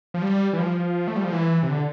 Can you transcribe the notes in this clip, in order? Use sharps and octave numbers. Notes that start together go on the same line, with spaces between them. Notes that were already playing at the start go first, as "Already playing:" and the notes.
F3
G3
E3
F3
A3
G3
F3
E3
C3
D3